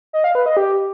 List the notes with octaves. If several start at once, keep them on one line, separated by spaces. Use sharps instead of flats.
D#5
F5
B4
D#5
G4